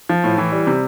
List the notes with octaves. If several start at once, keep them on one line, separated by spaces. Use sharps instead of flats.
F3
A2
E3
G3
C3